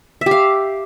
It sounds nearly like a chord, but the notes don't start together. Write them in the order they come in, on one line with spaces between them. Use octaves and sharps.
E5 G4 F5